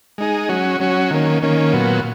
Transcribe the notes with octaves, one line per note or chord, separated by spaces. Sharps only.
G#3 D#4 G#4
F#3 C#4 F#4
F#3 C#4 F#4
D#3 A#3 C#4
D#3 A#3 C#4
A#2 F#3 B3